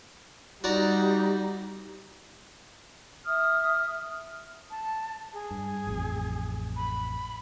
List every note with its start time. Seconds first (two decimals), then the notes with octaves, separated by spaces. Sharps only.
0.64 G3 D#4 F#4 D5 A#5
3.25 E5 D#6 F6
4.70 A5
5.33 G#4
5.51 G2
5.87 A1 F2
6.76 B5